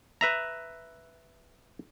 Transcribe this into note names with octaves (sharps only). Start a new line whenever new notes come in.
B4 E5 A#5